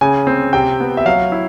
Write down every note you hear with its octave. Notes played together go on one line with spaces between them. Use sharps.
C#3 G#5
C4
C3 G5
B3
E5
F#3 F5
E4